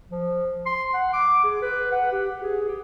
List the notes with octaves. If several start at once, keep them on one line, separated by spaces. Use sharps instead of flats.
F3
C6
F#5
D6
G#4
B4
F#5
G4
G#4
G4